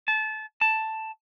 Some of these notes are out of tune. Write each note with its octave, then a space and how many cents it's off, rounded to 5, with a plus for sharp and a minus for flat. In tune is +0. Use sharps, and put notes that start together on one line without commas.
A5 -25
A5 +5